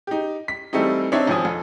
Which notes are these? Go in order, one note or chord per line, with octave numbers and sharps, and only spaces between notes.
D#4 G4
B6
E3 G3 A3 C4 D#4
C4 D4 D#4 C#5 E5 G5
G#1 F3 C4 G#5 D#6
F2